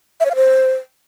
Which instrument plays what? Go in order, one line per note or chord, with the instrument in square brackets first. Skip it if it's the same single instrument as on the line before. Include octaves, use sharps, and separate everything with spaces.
[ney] E5
C#5
F5
C5